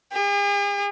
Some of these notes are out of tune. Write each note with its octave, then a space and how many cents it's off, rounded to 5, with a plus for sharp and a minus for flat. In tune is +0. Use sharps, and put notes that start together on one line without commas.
G#4 -45